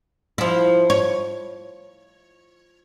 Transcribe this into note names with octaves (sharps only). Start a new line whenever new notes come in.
F3 E4
C#5